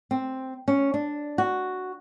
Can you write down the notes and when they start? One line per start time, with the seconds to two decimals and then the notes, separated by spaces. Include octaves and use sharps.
0.11 C4
0.68 C#4
0.94 D4
1.38 F#4